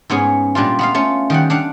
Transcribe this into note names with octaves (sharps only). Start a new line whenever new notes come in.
G#2 B3 C#4 G#4
A#2 G3 D4 F4
B3 F4 F5
A3 C#4 F4
D#3 G3 F#5
D4 F5 F#5